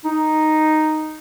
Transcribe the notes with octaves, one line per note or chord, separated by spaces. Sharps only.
D#4